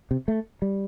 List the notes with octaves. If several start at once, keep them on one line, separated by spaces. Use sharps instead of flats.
C3
A3
G3